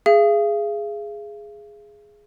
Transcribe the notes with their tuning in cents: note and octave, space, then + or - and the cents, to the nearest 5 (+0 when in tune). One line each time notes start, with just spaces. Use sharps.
G#4 +0 F5 -40